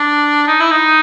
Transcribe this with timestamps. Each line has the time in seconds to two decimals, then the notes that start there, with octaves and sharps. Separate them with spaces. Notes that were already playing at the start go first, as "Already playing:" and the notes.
Already playing: D4
0.47 D#4
0.60 E4
0.71 D#4